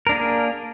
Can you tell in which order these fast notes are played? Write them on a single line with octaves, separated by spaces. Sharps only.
A#4 D4 A#3 G#4